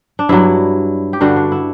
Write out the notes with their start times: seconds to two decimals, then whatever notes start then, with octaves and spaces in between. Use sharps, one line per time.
0.19 D4
0.29 G2 F#3 E4
1.13 G4
1.21 G2 D3 G3 F#4
1.36 D4
1.52 E4